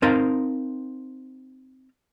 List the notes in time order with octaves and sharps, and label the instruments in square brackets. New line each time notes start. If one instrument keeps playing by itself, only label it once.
[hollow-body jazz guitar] C4 D#4 A#4 F5 A5